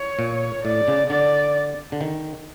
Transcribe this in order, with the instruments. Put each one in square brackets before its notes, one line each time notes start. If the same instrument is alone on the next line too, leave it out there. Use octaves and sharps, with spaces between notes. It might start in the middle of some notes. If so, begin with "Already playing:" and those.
Already playing: [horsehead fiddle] C#5
[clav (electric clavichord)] A#2
[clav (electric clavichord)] A2 [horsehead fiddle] D5
[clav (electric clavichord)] C#3
[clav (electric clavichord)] D3 [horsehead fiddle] D5
[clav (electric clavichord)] D3
D#3